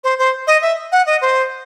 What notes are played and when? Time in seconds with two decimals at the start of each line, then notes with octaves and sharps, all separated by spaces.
0.04 C5
0.19 C5
0.47 D#5
0.62 E5
0.92 F#5
1.06 D#5
1.22 C5